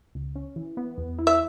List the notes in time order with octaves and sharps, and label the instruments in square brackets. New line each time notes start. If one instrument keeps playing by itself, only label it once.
[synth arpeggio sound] C#2
C#4
E3
B3
E2
E4
[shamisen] E5